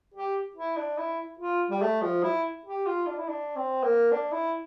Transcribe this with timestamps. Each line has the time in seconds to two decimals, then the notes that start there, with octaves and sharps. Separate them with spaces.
0.14 G4
0.56 E4
0.77 D4
0.98 E4
1.39 F4
1.70 G3
1.82 A3
2.02 F3
2.23 E4
2.65 G4
2.86 F4
3.07 D4
3.18 E4
3.28 D4
3.56 C4
3.83 A#3
4.12 D4
4.32 E4